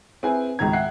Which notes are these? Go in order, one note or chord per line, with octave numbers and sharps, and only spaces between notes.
C4 E4 G#4 B4 G#5
G#1 C#2 G#2 D#3 A#5 G#6
E5 F#5 G5 F#6 C7